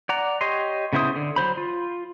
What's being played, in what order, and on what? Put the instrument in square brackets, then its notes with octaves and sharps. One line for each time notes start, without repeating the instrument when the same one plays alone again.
[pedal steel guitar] D5 F#5 A#5
G4 C#5 D#5 C6
C#3 B3 E4 C5 D#6
D3
F#3 A#4 C5 B5
F4